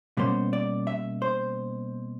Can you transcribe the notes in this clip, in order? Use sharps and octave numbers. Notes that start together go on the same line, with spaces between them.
B2 G3 A#3 C#4 C5
D5
E5
C5